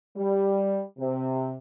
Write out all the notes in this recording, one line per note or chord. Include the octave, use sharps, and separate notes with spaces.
G3
C3